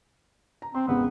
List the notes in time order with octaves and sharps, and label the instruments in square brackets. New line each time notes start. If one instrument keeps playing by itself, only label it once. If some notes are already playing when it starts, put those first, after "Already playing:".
[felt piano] A#5
[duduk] C4 [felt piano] C6
[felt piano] G#1 E2 C#3 [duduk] B3